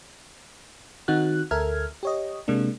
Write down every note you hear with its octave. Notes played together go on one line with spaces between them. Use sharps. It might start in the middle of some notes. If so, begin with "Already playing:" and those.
D#3 C4 D#4 F#4 F#6
D2 A4 A#4 E5 F6 G#6
G4 C#5 D#5
C3 G#3 A#3 D4